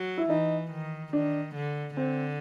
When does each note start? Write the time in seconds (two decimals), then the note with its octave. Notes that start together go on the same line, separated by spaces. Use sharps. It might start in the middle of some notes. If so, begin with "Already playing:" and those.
Already playing: F#3
0.18 E4
0.29 E3 D#4
0.71 D#3
1.13 D#3 D4
1.55 D3
1.97 D3 C4